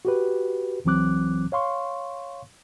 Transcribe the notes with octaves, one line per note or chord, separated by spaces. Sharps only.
F#4 G4 B4
C#2 E3 F#3 C4 D6 F#6
C#5 F5 C6 C#6